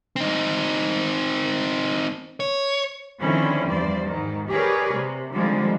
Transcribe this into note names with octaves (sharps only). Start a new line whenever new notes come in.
C4 D#4
C#5
D3 D#3 F3 C4 C#4 E4
E2 G2 C5 D5
G#2 D#3
G4 G#4 A#4 B4 C#5 D5
C3
D3 D#3 F3 G3 G#3 C4